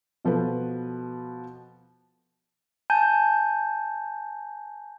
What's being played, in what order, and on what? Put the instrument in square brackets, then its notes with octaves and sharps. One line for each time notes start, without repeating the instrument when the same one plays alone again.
[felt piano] B2 F3 A4 B4
[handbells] G#5 A5 G6